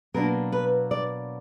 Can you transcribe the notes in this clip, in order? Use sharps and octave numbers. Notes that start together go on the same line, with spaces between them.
B2 F#3 A#3 D4 A#4
B4
D5